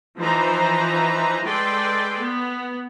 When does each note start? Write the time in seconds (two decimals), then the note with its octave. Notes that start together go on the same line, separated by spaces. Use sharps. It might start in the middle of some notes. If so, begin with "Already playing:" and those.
0.18 E3 F3 D#4 B4 C5 A#5
1.44 G#3 A4 B4 D5 G5 C6
2.18 B3